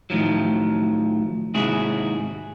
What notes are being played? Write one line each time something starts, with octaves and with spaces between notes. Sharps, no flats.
A2 D#3 F3 F#3
D#2 G#2 C3 E4 F#4 G#4